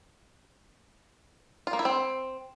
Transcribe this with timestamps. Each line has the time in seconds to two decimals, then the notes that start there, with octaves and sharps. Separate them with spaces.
1.67 F4
1.73 A#3
1.79 E4
1.85 C4